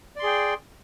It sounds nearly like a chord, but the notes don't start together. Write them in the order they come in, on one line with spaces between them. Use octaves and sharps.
D5 C6 G#4 G5